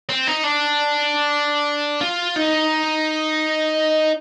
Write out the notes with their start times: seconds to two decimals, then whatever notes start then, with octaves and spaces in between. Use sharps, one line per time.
0.09 C4
0.27 D#4
0.44 D4
2.01 F4
2.36 D#4